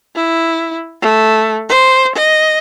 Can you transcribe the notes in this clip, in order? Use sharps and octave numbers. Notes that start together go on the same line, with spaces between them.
E4
A3
C5
D#5